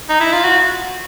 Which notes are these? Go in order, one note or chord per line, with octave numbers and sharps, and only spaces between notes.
D#4
E4
F4
F#4